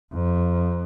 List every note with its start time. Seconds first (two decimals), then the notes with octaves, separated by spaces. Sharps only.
0.13 F2